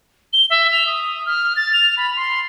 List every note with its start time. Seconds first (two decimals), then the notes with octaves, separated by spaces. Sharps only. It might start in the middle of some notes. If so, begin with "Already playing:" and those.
0.33 G7
0.50 E5
0.72 F7
0.86 D#6
1.26 F6
1.56 A6
1.73 F7
1.97 B5
2.16 C6